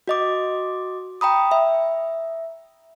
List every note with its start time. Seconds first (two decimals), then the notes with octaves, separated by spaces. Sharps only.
0.08 F#4 D#5 D6
1.21 G5 A#5 B5 D#6
1.51 E5